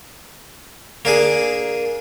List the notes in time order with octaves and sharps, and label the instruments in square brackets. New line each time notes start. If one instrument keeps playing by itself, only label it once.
[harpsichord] A#3 D4 G#4